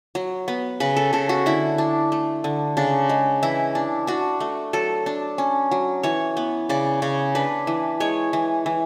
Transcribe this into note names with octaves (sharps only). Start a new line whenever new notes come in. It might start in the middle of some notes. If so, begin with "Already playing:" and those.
F#3
B3
C#3 B4
A4
C#3 A4
F#4
D3 E4
D4
A3
D3
C#3 D4
G#3
E3 E4
D4
D4 F#4
A3
F#3 A4
D4
C#4
F#3
E3 C#5
B3
C#3 D5
C#3 C#5
D4 B4
E3
G#3 C#5
E3
E3